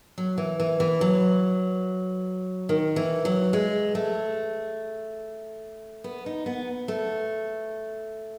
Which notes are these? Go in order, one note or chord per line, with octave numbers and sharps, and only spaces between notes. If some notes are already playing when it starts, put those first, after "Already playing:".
F#3
E3
E3
E3
F#3
D#3
E3
F#3
G#3
A3
B3
D#4
B3
A3